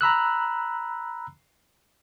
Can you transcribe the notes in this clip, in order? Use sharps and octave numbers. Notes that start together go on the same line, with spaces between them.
A#5 B5 E6 F#6